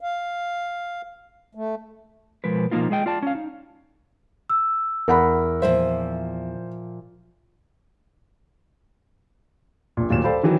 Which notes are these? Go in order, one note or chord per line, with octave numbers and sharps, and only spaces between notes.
F5
A3
B2 F3 G#3 A#4 B4
B2 F3 F#3 A#3 D#4 F4
G#3 G#4 D#5 G5
F4 D5 A5
C#4 F5
D#4
E6
E2 A#4 F#5 B5
A#2 F3 C5 E5
A#1 A#2
D1 D#2 A#2 E7
A4 C5 D5 F5 G5 B5
D#3 E3 F#3 C4